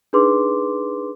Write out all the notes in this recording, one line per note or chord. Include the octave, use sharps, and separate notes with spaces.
D4 D#4 G#4 B4 C6 D6